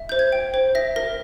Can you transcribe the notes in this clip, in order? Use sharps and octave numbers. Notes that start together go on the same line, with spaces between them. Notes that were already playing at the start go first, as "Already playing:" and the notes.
Already playing: E5
C5 G6
G#6
G5
C5
E5 A#6
A#4 A#6